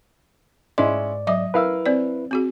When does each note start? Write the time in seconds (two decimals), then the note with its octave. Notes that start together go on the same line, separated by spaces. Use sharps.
0.78 G#2 G#3 C#4 E4 D5 D#5 C6
1.27 F#3 D#5 E5 D6
1.54 E4 A#4 B4 F5 E6
1.86 C4 C5 D5
2.31 C4 F#4 G#4